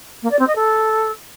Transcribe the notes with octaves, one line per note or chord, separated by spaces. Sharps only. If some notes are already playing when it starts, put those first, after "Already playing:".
A#3
D5
C4
D#5
A4